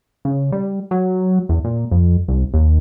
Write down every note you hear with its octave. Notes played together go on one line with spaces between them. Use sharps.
C#3
G3
F#3
E2
A#2
F2
C2
D#2